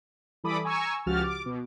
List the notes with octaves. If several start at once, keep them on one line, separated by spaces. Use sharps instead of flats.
E3 G3 A4 B5 D6 D#6
G#5 A#5 C#6 E6
C#2 F3 F#4 G4 F6 A6
D6
B2